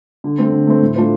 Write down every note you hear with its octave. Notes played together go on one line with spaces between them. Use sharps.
D3
A3 C4
D3
A3 C4
A2
A3 D4 F4 C5